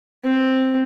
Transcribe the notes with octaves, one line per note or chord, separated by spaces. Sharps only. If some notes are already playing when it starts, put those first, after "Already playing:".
C4